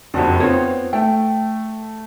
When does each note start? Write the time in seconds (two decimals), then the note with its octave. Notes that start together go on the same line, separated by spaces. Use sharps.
0.14 F#1 F2 D4 F#4 G4
0.40 B3 C4 F4 C#5
0.93 A3 G5